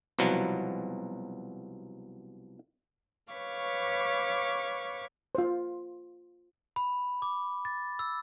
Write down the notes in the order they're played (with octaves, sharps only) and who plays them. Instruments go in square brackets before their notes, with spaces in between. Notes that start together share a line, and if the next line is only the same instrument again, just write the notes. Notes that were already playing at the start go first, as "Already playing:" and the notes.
[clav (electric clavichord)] C2 B2 F3 F#3
[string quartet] B4 C#5 F5 C#6 D6
[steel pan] F4 C5
[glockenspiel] B5
D6
A6
E6